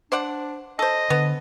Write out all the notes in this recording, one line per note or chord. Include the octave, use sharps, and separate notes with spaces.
D4 C5 D5 F#5
A4 C5 D#5
D3 B3